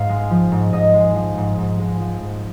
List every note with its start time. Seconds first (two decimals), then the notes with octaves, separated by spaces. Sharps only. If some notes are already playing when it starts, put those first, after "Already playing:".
Already playing: G#2 F5
0.09 G#3
0.30 F3
0.52 G#2
0.73 G#2 D#5
0.94 G#3
1.15 F3
1.37 G#2
1.58 G#2
1.79 G#3
2.00 F3
2.21 G#2